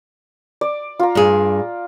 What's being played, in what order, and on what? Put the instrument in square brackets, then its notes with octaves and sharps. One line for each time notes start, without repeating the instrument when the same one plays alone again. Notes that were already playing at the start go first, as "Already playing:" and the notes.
[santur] D5
F4 A#5
[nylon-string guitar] G2 G#4